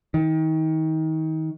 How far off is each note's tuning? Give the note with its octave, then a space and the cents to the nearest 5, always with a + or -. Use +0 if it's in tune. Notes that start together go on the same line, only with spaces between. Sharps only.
D#3 +30